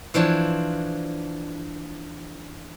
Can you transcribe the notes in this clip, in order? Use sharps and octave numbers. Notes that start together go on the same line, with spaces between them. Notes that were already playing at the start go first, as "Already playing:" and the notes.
E3 F3 D4 C#5